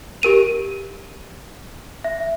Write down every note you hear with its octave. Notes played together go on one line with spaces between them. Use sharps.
G4 A#4 D#7 F7
E5